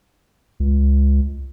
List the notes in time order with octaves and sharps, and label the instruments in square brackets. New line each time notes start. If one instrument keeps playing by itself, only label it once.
[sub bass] C#2